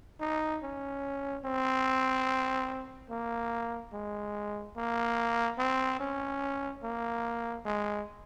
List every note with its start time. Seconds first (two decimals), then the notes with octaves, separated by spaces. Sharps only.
0.20 D#4
0.63 C#4
1.44 C4
3.10 A#3
3.93 G#3
4.76 A#3
5.58 C4
6.00 C#4
6.83 A#3
7.65 G#3